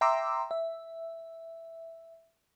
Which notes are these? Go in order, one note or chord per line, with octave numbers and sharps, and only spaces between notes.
E5 G5 A#5 C6 D6 E6
E5